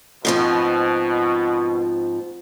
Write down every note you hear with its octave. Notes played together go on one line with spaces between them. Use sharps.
G#2 B2 F3 C4